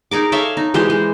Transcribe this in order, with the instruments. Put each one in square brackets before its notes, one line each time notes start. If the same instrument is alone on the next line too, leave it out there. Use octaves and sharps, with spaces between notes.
[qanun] D#4 G#4 A#4 D6
A4 C#5 E5 F5
D#4
E3 G#3 G4 C5
G#3